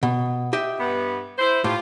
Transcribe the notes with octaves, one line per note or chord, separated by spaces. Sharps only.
B2
G4 D#5 E5
G2 B3
E4 C5
A2 F4 G4